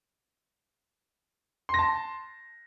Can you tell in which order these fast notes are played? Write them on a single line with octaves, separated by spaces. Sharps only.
C6 A#6 A5